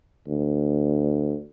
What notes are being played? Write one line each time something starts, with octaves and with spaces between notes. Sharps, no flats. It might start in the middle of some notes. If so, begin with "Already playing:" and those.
D2